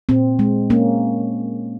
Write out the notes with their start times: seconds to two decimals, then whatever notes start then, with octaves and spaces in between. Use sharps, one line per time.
0.09 A#2 C4
0.39 G#3
0.70 A#2 A#3 C#4